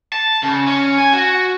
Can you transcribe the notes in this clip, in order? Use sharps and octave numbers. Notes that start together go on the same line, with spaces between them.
A5
C#3
C#4
G#5
F#4